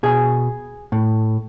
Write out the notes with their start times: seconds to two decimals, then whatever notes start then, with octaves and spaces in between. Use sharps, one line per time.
0.03 B2 G#4
0.92 A2